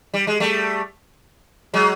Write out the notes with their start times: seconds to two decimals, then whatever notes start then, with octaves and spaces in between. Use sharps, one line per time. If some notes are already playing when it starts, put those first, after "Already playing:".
0.14 G3
0.27 G#3
0.40 G3 A3
1.74 F#3 G#3